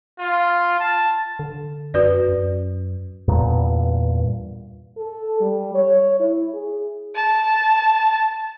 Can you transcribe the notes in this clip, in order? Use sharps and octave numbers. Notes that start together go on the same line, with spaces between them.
F4
A5
D3
F#2 F#4 B4 D5
F#2
E2 G2 A#2
A4
G3
C#5
E4
G#4
A5